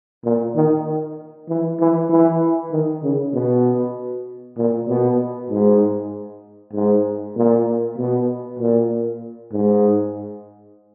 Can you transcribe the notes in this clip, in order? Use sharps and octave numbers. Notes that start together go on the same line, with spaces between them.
A#2
D#3
E3
E3
E3
D#3
C#3
B2
A#2
B2
G#2
G#2
A#2
B2
A#2
G#2